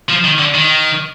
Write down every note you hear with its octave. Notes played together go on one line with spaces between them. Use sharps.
F3
D#3
D3
D#3